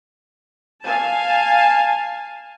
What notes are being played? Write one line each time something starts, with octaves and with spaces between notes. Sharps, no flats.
F5 G#5 A5